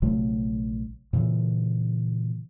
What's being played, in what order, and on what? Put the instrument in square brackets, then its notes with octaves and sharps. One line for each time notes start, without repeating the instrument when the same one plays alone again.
[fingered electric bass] A#1 C3 F#3 A3
A#2 C#3 E3